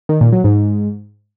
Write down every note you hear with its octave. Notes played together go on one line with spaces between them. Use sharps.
D#3
A#2
F#3
G#2